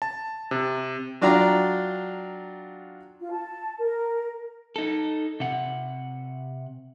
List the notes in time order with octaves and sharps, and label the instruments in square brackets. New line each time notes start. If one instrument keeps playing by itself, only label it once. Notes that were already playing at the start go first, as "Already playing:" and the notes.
[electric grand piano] A5
C3
[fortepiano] F#3 D4 F4 D5 G5 A#5
[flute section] F4
A5
A#4
[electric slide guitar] D#4 A4
C3 F#5